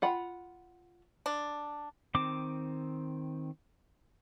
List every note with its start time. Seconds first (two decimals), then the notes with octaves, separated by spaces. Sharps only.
0.02 F4 F#5 B5
1.26 D4
2.15 D#3 C4 D6